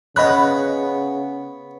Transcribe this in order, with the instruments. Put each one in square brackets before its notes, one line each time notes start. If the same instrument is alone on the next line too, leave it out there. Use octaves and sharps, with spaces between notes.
[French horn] C#3 [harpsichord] B3 C#5 [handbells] D#5 B5 F#6